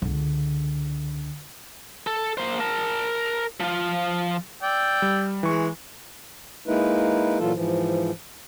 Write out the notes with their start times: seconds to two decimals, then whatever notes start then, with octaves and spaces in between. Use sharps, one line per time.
0.02 C#2 D3
2.07 A4
2.38 A#3 C5
2.60 A#4 A5
3.60 F3 F4
4.63 D5 G5 E6
5.02 G3
5.43 E3 G#3 C#6
6.67 G#3 A#3 D#4 E4 B4
7.39 A#2 E3 F#3 F4 A4
7.54 G#2 E3 F3